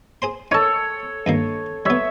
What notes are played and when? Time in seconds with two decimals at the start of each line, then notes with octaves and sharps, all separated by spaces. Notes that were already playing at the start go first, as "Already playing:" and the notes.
0.22 G#4 C5 C6
0.51 D#4 A4 C#5 A5
1.26 G2 D#3 A#3
1.86 G3 B3 C#5 E5